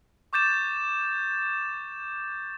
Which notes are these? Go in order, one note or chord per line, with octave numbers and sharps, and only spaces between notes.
C#6 D6 G6 A6 E7